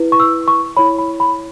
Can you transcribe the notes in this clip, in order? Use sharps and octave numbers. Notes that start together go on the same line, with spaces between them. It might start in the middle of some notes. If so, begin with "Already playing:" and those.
Already playing: E4 B4
C#6
E6
C#6
E4 C#5 B5
B5
B5